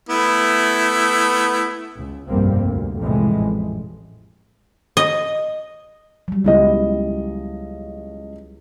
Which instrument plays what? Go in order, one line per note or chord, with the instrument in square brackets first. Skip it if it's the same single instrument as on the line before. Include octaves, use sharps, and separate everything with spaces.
[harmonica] A3 B3 E4
[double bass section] C#2
F1 B1 G2 G3 A#3 C4
D2
C2 F2 A2 E3 G3 G#3
A1
[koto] D#5
[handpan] F#3 G3
[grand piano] C#2 D#5 [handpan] B3 E4 G4